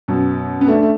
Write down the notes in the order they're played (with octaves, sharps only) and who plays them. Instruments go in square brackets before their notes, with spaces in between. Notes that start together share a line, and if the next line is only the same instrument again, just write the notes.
[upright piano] F#2 B2
B3
A3 D4
A3